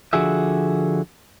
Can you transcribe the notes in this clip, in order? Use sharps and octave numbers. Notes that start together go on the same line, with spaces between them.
D3 F3 F#4 G#4 E5